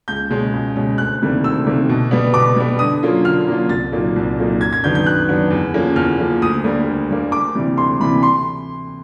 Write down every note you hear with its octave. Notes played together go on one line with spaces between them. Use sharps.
C#2 G6
B2 G#3 C#4
C#2
B2 G#3 C#4
D2 F#6
C3 D#3 G3 A#3
D2 E6
C3 D#3 G3 A#3
B2
G3 B3
B2 D6
G3 B3
D3 D#6
F#3 A#3 C#4 F4
D3 F6
F#3 A#3 C#4 F4
C2 A6
A#2 F#3 A#3 D#4
C2
A#2 F#3 A#3 D#4
F#2 G#6
G#6
D#3 F#3 B3 D4 G6
G6
F#2 F#6
D#3 F#3 B3 D4
E2
C#3 F3 A#3 C#4
E2 F6
C#3 F3 A#3 C#4
D2 D#6
D3 G3 A#3
D2
D3 G3 A#3
D2 D6
C3 E3 G3
D2 C6
C3 E3 G3 B5
C6